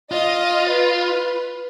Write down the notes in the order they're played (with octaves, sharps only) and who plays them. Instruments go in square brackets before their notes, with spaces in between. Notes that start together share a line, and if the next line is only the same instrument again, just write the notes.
[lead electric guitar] F4 [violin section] D#5
[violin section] B4